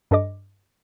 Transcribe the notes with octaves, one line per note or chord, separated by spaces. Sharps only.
G2 D4 A4 D#5 D6